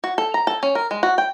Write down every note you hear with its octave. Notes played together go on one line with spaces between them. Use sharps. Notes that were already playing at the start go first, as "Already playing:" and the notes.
F#4
A4
A#5
A4
C#4
A#4
G#3
F#4
G5